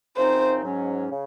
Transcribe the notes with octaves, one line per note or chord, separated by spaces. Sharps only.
F#2 C#3 F3 C4 D#4 C5
G#2 F#3 C#4
C#3